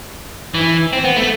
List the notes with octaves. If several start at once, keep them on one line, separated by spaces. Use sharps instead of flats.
E3
C4
B3
A3